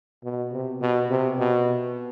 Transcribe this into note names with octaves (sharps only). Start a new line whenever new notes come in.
B2
C3
B2
C3
B2